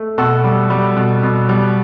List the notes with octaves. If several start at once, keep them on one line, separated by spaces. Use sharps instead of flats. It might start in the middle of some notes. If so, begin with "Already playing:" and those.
Already playing: A3
B2 F#4 A4
G3
G3
B2
B2
G3